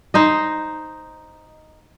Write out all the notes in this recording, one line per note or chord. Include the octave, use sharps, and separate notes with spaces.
D#4 C5 D#5